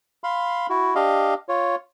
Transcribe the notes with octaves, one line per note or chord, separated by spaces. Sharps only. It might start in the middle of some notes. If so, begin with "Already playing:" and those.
F5 B5 C6
E4 F#4
D4 G4 D#5 F5
F4 C#5